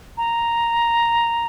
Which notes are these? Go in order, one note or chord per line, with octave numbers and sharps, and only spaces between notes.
A#5